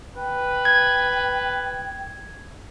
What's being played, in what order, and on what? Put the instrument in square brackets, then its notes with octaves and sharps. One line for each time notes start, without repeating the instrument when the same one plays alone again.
[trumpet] B4 [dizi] G5
[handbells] G#6